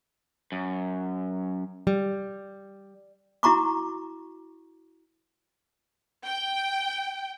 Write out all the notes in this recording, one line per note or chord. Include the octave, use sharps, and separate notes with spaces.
F#2
G3
E4 F#4 A#5 C#6 D6
G5